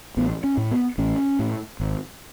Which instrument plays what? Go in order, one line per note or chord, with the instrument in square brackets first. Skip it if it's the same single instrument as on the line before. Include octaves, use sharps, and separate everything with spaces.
[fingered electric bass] A1 B3
C#4
A2
B3
A1 C#4
A2
G#1